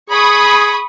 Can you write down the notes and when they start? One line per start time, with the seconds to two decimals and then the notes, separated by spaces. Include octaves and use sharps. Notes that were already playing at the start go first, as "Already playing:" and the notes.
0.10 G#4 B5 C#6 D#6